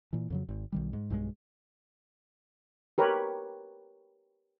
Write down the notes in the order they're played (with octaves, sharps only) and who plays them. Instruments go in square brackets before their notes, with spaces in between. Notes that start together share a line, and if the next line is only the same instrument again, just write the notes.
[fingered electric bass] A#2 E3
F2 C#3 F#3
G#1
B1 D#3 G3
G#2
B1 G2 D#3 G#3
[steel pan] G4 A#4 B4 C#5